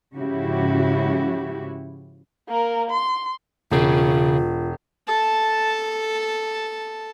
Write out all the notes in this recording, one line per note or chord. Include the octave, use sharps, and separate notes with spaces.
G#2 C#3 F3 E4 F#4 G4
A#3 A#4
C6
E1 C#3 F4 G#4
A4 A5